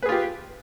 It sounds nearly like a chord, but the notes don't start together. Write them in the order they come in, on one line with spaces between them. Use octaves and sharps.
B4 G#4 F4 G4